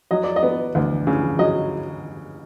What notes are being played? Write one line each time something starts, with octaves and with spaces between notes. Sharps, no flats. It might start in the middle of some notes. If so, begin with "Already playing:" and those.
F#3 D#5
D5
D#5
B3
D2
C#3
F#3 D#5